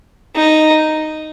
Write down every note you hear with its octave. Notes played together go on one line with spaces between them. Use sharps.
D#4